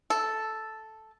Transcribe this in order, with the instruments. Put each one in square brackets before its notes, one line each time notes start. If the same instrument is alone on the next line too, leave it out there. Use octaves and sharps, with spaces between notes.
[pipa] A4